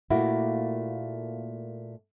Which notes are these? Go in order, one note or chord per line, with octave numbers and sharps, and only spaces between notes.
A#2 A3 A#3 E4 F#4